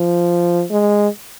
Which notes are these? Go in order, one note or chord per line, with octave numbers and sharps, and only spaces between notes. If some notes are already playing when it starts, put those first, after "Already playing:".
Already playing: F3
G#3